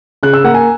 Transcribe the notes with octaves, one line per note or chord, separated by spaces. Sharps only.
C#3 F#6
E6
A#3 F#5
G#5